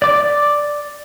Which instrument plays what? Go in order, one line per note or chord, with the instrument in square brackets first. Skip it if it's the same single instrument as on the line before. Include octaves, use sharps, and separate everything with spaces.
[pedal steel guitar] D5 D6